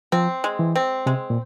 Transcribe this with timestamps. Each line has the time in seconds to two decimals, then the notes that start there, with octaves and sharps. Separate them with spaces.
0.12 F3 C4
0.44 G#3
0.59 E3
0.75 C4
1.06 C3 G#3
1.30 A#2